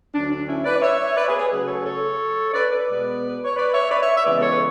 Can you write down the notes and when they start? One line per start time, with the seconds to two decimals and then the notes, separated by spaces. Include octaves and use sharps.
0.15 D2 D3 F#3 D4
0.32 D4
0.48 C#4 E4
0.65 B4 D5
0.75 D5
0.82 C#5 E5
1.16 B4 D5
1.28 G#4 B4
1.39 G#4 B4
1.51 C#3 F#3 A3 G#4 B4
1.68 A4 C#5
1.86 A4 C#5
2.54 B4 D5
2.71 B4 D5
2.89 B2 G#3 B3
3.29 B4
3.44 C#5
3.56 B4 D5
3.74 C#5 E5
3.91 B4 D5
4.02 C#5 E5
4.16 E5
4.25 C#3 E3 G#3 B3 B4 D5
4.38 D5
4.42 A4 C#5
4.53 B4